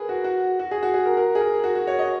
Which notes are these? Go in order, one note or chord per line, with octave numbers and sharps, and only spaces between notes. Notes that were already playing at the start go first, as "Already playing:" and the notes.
Already playing: G#4 A#4 B4
F#4
F#4
F#4
G#4
F#4
G#4
A#4
A#4
G#4
A#4
F#4
F#4
C#5
D#5